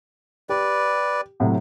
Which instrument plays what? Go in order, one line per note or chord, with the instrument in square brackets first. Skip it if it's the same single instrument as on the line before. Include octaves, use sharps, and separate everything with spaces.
[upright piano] G4 [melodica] B4 D5
[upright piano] A2 C3 F#3